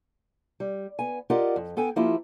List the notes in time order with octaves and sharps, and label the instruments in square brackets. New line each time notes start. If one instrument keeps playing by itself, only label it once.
[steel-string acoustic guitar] G3
B3 G#5
F4 G4 A#4 D5 D#5 F#5
F2
B3 A4 G5 G#5
F3 A#3 E4 F4 G4